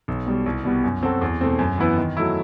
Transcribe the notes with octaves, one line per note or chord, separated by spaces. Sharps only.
B1
B2 G3
C2
B2 G3 B3
F#2
F#3 C4 F#4 A4
E2
B2 A3 C4
F#2
E3 B3 E4 B4
D#3
F#3 A3 E4